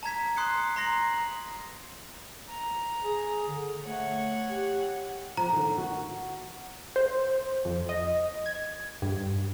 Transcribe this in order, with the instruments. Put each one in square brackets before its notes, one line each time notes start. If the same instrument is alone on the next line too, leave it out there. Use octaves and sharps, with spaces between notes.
[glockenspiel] A5 A#5 G#6 B6
C6 D#6 F#6 C7 C#7
A#5 C6 A#6 C7 F#7
[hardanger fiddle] A#5
[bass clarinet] G#4
D3
[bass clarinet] A3 [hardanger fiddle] C#5 F#5
[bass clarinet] G4
[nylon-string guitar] F3 [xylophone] A#5
[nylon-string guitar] D3 D#3
F#4
[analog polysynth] C5
F2
D#5
G#6
G2